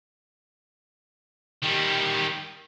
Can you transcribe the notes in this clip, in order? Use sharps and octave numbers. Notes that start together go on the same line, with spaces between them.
D#3 G3